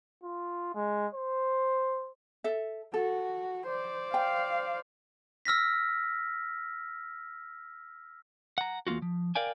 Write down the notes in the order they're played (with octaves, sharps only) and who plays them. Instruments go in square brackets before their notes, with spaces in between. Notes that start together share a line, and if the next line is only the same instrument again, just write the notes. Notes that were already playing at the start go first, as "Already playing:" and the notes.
[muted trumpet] F4
G#3
C5
[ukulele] A4 E5
[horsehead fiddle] F#4 [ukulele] A4
[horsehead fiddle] C5 D5
[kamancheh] F5 [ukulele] G5
[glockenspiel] E6 F6 A#6 B6
[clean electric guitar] F#5 A#5
E2 A#3 C4 F4 F#4
F3
A#4 D5 F5 G5 G#5